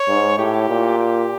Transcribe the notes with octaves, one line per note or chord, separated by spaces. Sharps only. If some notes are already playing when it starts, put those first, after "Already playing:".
Already playing: C#5
G#2
A2 G4
A#2
G4